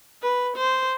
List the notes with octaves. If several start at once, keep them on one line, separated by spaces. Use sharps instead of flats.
B4
C5